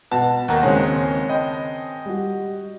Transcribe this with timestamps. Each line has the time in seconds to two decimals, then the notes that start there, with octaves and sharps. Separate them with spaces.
0.12 B2 A5
0.48 D#2 D#3 F#5 A#5
0.63 C#3 G#3 C4 C#4 C#5
1.30 D#5 G5 A5 B5
2.06 G3 F#4